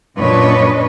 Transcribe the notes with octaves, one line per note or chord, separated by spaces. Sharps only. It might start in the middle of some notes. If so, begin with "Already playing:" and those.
F#2 A#2 D4 B4 C#5 D#5